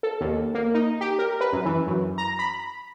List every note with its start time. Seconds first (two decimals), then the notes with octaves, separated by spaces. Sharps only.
0.03 A4
0.21 D#2
0.55 A#3
0.74 D#4
1.01 G4
1.19 A#4
1.41 B4
1.52 F#2
1.65 E3
1.87 F#2
2.18 A#5
2.39 B5